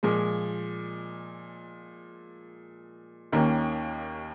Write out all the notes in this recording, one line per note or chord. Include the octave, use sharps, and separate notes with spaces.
A#2 F3 G#3
D#2 D#3 A#3 C#4